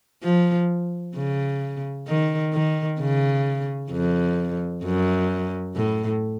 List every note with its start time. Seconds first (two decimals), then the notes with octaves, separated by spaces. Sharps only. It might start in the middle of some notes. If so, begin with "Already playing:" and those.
0.23 F3
1.16 C#3
2.08 D#3
2.53 D#3
3.00 C#3
3.91 F2
4.84 F#2
5.75 A2